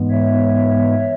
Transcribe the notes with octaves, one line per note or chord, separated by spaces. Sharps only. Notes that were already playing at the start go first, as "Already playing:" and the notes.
Already playing: G#2 E3 G#3 B3
C#5 E5